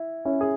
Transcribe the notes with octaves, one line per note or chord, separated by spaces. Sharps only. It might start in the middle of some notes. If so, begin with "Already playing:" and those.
Already playing: E4
C#4 E4
G#4